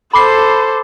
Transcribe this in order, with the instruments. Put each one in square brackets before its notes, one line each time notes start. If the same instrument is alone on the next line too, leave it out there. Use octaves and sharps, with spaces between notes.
[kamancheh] A4 C5 [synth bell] B5 D6 C7